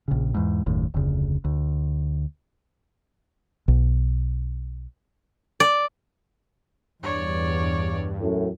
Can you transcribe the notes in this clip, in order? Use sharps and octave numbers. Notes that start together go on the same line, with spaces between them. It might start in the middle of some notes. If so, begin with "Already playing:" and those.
A#1 C#3
E2 G#2
F#1 D#2 A2
F1 D2 C#3
D2
B1
D5
E2 G2 C#5 D5
F#2 A2